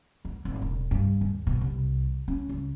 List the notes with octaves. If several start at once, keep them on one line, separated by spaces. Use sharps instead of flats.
E2
G#1
E1
G2
D#2
B2
C2
C#4
C#2